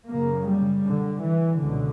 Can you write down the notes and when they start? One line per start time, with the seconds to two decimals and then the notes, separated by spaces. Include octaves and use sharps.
0.10 F#2 C#3 A#3
0.49 G3
0.86 D3
1.23 E3
1.59 C#2 B2 D3